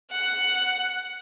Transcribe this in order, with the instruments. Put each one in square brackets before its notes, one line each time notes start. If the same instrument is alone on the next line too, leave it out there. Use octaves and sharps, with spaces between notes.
[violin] F#5